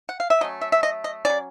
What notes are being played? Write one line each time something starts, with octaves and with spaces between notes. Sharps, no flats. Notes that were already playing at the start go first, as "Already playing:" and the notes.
F#5
F5
E5
F#3 A3 C#4 D#5
E5
E5
D#5
D#5
F#3 A3 C#4 D5